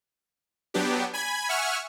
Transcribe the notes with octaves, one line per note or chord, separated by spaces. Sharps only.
F#3 B3 D4 G4
G#5 B5 G#6
E5 F#5 G#5 C#6 F6